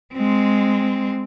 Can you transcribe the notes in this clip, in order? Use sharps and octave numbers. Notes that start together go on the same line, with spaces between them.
G#3 C4